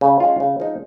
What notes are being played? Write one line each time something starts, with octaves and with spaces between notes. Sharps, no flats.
C#3
G#3 C#4 F4
C#3
F3 G#3 D#4